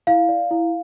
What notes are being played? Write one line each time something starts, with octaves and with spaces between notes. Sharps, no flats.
E4 F5
D5
E4